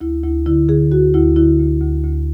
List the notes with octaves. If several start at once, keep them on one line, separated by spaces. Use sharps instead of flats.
D2 E4
D2 E4
D3 E4
D3 G#4
D2 F#4
D2 E4
D3 E4
D2
D2
D2